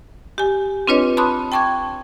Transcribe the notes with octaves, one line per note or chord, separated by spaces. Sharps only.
G4 G#5
C4 D4 F4 B4 C#5 D#5
A5 B5 C6 D6 D#6 F#6
G5 A5 C#6 D6 G#6